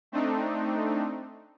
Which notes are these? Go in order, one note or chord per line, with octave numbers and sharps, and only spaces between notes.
A3 C4 D4 D#4